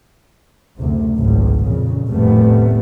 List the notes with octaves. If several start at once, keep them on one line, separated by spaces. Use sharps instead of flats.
F#1 D2 C3
G#1 C#2 F#2
F2 A#2 C#3
F1 D#2 A2 G3 A3 B3